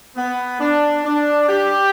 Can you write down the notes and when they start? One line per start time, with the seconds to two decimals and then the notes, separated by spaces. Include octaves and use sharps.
0.16 B3
0.60 D4
1.04 D4
1.49 G4